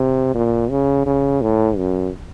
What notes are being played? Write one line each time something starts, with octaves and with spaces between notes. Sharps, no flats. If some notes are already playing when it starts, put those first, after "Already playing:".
Already playing: C3
A#2
C#3
C#3
A2
F#2